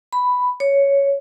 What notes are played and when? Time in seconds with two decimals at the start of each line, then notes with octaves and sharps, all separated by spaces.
0.13 B5
0.60 C#5